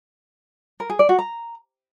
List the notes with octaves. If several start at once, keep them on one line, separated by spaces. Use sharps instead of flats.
A#4
G#4
D5
F#4
A#5